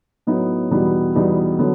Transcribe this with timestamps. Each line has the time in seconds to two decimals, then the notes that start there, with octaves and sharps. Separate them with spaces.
0.27 A2 F#3 B3 D#4
0.71 E2 B2 G3 B3 D#4
1.15 E2 B2 G3 B3 D#4
1.59 D3 F#3 B3